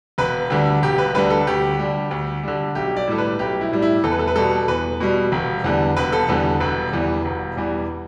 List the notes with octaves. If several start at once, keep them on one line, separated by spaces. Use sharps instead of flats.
E1 B4
D2 D3 G3
E1 G4
B4
D2 D3 G3 B4
A4
D2 G4
D3 G3
D2
D3 G3
B1 G4
D5
A2 G3 A4
B4
B1 G4
E4
A2 G3
E4
E2 A4
B4
A4
B4
B2 G3 A4
E2 B4
B2 G3
E1
E2 D3 G3
E1 B4
A4
E2 D3 G3 B4
A4
E1 B4
E2 E3 G3
E1
E2 E3 G3